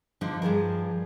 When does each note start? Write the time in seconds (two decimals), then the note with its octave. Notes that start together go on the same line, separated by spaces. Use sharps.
0.21 D3 F3 D4 D#4
0.42 G2 F3 G#4 A#4